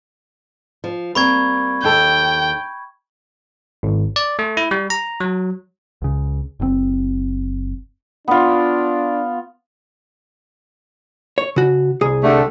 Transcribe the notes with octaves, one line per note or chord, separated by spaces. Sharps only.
F3
G3 A#3 C4 B5 C#6 G#6
D#2 A4 G5
G#1
D5
A3
E4
G3
A#5
F#3
C#2 C#3
F#1 A#2 C4
B3 D4 F4
C#5
C#3 F#4
C2 G#4
D3 G3 A3